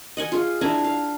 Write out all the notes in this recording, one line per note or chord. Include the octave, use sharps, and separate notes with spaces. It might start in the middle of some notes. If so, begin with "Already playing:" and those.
D#5 F#5 G#5
F4 G#4
D4 E4 G#5 A#5
F5